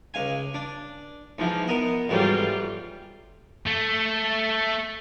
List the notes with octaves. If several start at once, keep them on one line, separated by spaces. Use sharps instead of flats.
C#2 F5 G#5
D4
G#2 E3 F3
B3 A#4 D#5
F2 G#2 E3 F#3 G3 F4
A3